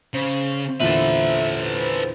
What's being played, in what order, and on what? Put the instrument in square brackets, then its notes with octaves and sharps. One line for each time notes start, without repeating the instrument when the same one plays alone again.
[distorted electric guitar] C#3 [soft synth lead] C5
[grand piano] E2 A#2 D3 [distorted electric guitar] A4 B4 [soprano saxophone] E5